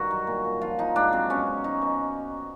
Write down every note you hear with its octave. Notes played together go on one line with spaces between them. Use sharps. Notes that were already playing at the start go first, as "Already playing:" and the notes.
Already playing: G2 D#3 F#4
F#3
A#2
A#2
F3 F4
F3 D#4
G#2 D4
F#3 C4
B2 C#4
F#3
F#3 D#4
B2